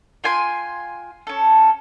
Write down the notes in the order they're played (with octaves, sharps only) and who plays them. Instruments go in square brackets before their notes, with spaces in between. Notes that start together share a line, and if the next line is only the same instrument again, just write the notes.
[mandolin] F4 G5 G#5 C6
C#4 A4